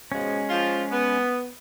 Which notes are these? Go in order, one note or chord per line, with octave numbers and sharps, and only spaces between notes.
G#2 B2 F3 G#3 C#4
F3 F4
B3